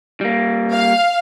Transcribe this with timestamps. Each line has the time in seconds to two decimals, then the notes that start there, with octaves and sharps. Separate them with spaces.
0.21 G3 A#3
0.72 F5